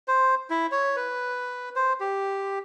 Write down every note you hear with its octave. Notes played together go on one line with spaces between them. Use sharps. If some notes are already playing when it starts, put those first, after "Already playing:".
C5
E4
C#5
B4
C5
G4